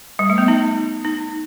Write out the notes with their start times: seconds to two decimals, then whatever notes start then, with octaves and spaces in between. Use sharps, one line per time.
0.19 G3
0.30 A3
0.38 B3
0.48 D#4
1.05 D#4